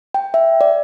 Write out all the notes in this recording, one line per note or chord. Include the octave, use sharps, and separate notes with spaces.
G5
E5
D5